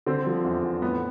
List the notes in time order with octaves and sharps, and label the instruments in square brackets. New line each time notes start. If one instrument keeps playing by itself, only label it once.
[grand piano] D3 C4
F3
E2
E2
A2 B3